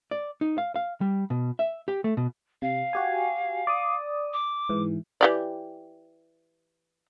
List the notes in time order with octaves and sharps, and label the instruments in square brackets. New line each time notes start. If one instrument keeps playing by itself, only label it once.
[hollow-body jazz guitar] D5
D#4
F5
F5
G3
B2
E5
G4
A3
B2
[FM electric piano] C3 [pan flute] F5
[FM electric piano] F#4 G4 G#5
D5 D#6
[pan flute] D6
[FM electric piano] G#2 E3
[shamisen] E3 G4 D5